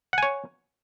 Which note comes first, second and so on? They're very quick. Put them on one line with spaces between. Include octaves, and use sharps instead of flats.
F#5 G#5 C#5